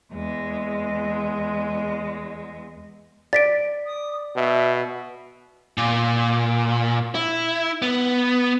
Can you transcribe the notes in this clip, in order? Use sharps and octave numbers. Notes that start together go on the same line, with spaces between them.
E2 G#3
D5 A6 B6 D7
D#6
B2 E5
A#2
E4
B3